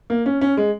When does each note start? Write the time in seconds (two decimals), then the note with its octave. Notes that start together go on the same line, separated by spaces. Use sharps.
0.10 A#3
0.26 C#4
0.41 C#4
0.57 G#3